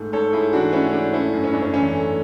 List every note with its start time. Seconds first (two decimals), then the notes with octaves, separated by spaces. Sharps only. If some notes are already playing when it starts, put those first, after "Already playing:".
Already playing: G#2 A3
0.13 G#2 A4 C#5
0.33 G#2 E4 G#4
0.53 E3 D4 F#4
0.73 A3 C#4 E4
0.93 G#2 D4
1.13 A3 C#4 E4
1.33 F#2
1.44 C#4
1.53 F#2 D4
1.62 C#4
1.73 E3 C#4
1.93 A3